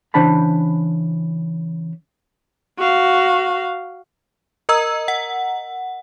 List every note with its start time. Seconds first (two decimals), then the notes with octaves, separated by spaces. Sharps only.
0.14 C#3 E3 D4 C5 A5 B5
2.79 F#4 F5
4.69 A#4 D#5 A#5 E6
5.08 F#5